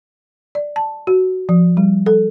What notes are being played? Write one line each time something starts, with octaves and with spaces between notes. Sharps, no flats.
D5
A5
F#4
F3
G3
A4